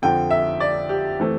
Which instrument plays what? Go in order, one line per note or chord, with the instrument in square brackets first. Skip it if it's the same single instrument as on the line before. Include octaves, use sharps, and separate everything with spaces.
[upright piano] F2 D3 F3 G5
E5
D5
G4
E3 A3 C4